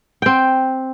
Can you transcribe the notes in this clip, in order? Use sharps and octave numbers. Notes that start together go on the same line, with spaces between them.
C4 G5